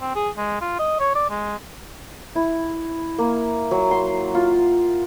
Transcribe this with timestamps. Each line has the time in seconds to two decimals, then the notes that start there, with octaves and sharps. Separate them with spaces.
0.01 C4
0.15 G#4
0.37 G#3
0.61 F4
0.79 D#5
1.00 C#5
1.15 D5
1.30 G#3
2.35 E4
3.18 A#3
3.71 F#3
3.91 C6
4.35 F4